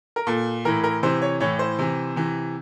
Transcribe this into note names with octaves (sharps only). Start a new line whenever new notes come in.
A#4
A#2 A4
A2 E3 A#4
A#4
C3 E3 C5
C#5
A2 E3 C#5
C5
C3 E3
C3 E3